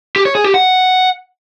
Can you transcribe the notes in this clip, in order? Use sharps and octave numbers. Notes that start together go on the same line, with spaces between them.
G4
C#5
G#4
G4
F#5